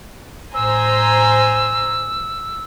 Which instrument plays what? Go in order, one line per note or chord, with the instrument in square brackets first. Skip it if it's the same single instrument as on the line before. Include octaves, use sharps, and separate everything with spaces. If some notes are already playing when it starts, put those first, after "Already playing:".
[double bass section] A2 [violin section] C5 G#5 A#5 [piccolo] E6